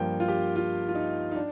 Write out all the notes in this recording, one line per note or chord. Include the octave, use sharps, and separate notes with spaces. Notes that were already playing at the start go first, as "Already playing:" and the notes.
Already playing: G2 F3 A#3 G5
F4
G4
F4
F4
D#4
D#4
D4